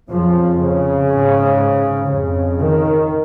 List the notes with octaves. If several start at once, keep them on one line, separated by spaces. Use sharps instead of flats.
F2 C#3 F3
C#3
G#2
F2 C#3
D#3